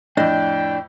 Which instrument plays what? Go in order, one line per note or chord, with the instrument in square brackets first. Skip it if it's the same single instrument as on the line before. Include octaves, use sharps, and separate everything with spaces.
[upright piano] F2 A2 [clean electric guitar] D4 [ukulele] D#5 [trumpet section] G5